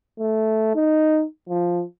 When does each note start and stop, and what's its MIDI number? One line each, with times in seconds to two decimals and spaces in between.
0.19 0.72 57
0.75 1.23 63
1.49 1.82 53